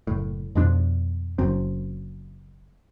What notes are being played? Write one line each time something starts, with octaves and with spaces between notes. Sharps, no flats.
F#1 A2
F2 B2 F3 D4
F#1 F#2 C4